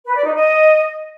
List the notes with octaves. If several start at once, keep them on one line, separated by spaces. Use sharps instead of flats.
B4
D5
D#4
D#5